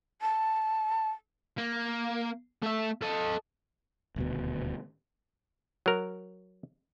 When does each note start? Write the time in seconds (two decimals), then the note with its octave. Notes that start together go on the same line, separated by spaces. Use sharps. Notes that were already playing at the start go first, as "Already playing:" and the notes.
0.22 A5
1.58 A#3
2.63 A3 E5
3.02 A4 D#5
4.16 D#1 D2 B2
5.86 F#3 A#4